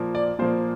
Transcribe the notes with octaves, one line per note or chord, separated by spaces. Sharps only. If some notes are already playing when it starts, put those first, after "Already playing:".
Already playing: A#2 F3 A#3
D5
A#2 F3 A#3 C5